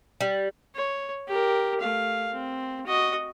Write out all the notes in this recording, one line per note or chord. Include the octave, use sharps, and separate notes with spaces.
G3
C#5
G4 A#4
A3 F5
C4
F#4 D#5